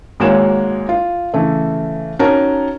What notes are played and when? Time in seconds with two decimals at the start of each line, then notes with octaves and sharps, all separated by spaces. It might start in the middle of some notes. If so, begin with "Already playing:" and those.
0.20 G#1 G#3 A#3 F#4 C#5 E7
0.89 F4
1.34 C#3 E3 A3
2.19 C#4 D#4 F#4 A#4 A5